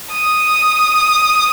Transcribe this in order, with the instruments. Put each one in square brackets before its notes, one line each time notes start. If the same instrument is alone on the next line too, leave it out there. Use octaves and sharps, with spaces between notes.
[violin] D#6